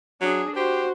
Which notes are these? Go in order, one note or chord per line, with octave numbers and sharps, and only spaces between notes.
F#3 D4 G#4
F#4 G4 C5